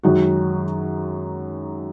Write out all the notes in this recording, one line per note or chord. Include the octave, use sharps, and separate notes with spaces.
F#2 D#3 G#3 D#4 F#4